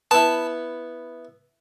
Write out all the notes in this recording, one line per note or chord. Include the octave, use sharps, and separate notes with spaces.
B3 E4 A5